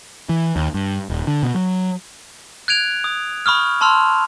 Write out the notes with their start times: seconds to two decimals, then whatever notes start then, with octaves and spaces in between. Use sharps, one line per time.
0.29 E3
0.56 D#2
0.74 G2
1.10 D#1
1.27 D3
1.43 B2
1.55 F#3
2.68 F#6 G#6 D7 F7
3.04 D#6
3.46 B5 C#6 D#6 F6
3.81 A5 B5 C6 E6 F6 F7